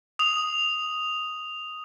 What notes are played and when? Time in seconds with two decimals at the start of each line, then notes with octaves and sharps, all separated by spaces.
0.19 D#6 F7